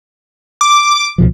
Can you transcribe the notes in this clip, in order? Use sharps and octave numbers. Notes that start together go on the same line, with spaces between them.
D6
C#2 B2 F3